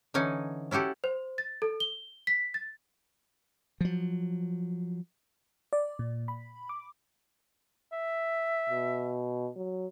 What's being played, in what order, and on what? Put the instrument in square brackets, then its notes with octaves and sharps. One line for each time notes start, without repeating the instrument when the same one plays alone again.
[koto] D3 E3 C#4 D#4 G#5
C#4 E4 F#4 G4 A4
[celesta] C5
A6
A4
G7
B6
A6
[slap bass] F3 F#3
[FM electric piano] D5
A#2
B5
D6
[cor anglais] E5
[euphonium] B2
F#3